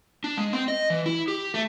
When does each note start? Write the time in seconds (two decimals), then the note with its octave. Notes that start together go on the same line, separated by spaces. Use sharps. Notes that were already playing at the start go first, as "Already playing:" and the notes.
0.24 D4
0.37 G#3
0.53 C4
0.68 D#5
0.90 E3
1.06 E4
1.28 G4
1.54 A3